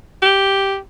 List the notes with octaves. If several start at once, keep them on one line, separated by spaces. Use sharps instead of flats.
G4